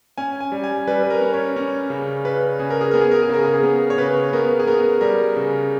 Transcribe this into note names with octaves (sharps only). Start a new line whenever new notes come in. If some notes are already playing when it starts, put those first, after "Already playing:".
C#4 G#5
G#5
G3
G#5
G3 B4
B4
A#4
C#4
C#5
C#4
C#3
C#3 B4
C#3 G#4
A#4
G#4
B3 A#4
G#4
A#4
G#4
C#3 A#4
G#4
G#4
B3 A#4
C#5
C#3 B4
B3 A#4
G#4
B3 A#4
G3 A#4
C#3